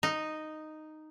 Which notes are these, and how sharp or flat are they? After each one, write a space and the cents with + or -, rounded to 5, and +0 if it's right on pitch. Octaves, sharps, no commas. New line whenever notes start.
D#4 -5